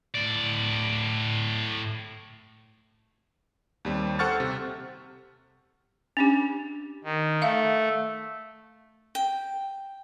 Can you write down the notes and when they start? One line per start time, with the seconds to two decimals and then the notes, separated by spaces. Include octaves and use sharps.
0.15 A2 D5
3.85 D#2 G3 C4
4.19 A4 C5 F#5 C#6 F6 A6
4.40 C3
6.17 C#4 D4 G4
7.04 D#3
7.42 A3 E5 F5
9.15 G5